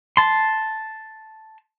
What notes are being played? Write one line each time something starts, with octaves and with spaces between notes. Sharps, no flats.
A5 C6